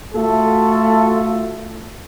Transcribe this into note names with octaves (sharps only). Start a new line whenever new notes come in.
A3 F4 F#4 A4